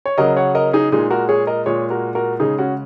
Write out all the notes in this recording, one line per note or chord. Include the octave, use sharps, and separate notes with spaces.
C#5
C#3 F#3 A#4 D#5
C#5 F#5
A#4 D#5
D#4 G#4
A#2 G#3 D#4 G#4
F#4 A#4
G#4 C#5
A#4 D#5
A#2 G#3 G#4 C#5
F#4 A#4
F#4 A#4
C#3 G#3 D#4 G#4
C#4 F#4